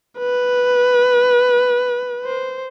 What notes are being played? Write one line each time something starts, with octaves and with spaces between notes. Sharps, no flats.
B4
C5